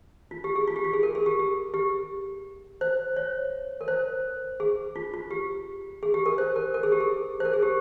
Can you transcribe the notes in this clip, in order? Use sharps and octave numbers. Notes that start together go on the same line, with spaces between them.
F4
G4
G#4
F4
G4
F4
G#4
A#4
G#4
G4
G4
G4
C5
C#5
A#4
C5
G#4
F4
F4
G4
G#4
G4
A#4
C5
A#4
A#4
G#4
G4
G#4
C5
A#4
G#4
G4